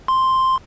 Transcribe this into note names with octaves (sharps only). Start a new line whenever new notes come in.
C6